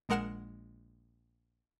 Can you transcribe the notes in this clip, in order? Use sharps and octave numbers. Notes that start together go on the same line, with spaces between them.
A#1 G#3 A#4 F#5 F6 E7